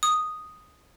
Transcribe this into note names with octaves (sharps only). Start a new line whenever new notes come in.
D#6